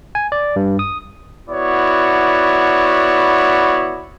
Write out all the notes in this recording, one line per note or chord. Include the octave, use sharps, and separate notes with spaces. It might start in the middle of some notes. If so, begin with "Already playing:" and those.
G#5
D5
G2
D#6
B3 E4 F#4 C#5 D5